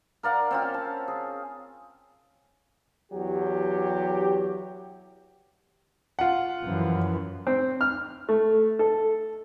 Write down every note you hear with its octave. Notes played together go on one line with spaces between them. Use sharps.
A#4 D5 F5 F#5
C4 C#4 F4
A5
G#4
E2 F#3 G4
F4 F#5
F#2 E3 F3
C4
F6
A3
A4